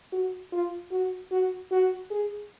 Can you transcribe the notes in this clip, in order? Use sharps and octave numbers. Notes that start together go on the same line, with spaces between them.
F#4
F4
F#4
F#4
F#4
G#4